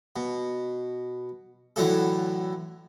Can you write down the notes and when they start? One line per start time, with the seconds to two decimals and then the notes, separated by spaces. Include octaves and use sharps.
0.16 B2
1.76 A2 D3 E3 F#3 A3 A4